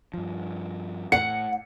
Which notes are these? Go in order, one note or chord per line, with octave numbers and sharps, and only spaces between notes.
G2 F3
A2 F#5 C#7